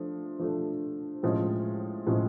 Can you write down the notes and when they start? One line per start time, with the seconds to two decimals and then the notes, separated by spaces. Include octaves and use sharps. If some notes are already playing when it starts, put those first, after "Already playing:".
Already playing: F3 A3 D4
0.40 F3 A3 D4
1.23 A2 F3 G#3 C#4
2.07 A2 F3 G#3 C#4